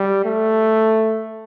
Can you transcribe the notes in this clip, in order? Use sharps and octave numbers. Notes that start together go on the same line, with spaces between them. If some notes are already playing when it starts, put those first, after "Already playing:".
Already playing: G3
A3